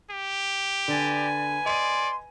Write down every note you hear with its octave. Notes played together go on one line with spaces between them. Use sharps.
G4
D3 B4 D5 G#5
D5 D#5 C6 D#7